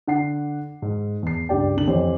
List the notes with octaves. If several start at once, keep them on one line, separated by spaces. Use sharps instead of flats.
D3 F#5 C7
G#2
E2 C7
C#2 G2 G4 D5 G5
C2 D3 F#7
F2 E3 G4 C5 C#5